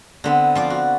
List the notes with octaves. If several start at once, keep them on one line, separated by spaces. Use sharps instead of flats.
D3 B3 C4
F3 F4 D5
F#4